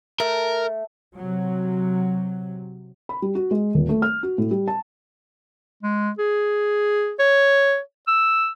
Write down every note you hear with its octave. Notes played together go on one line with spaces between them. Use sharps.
A3 A#4
C3 F#3
B5
G3
F#4
G#3
D#1
A3
F6
F#4
A2
G3
A5
G#3
G#4
C#5
E6